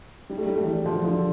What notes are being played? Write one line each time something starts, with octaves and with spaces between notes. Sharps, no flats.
G3
A3
G3
A3
E3 G3
D3 F3
D3 F3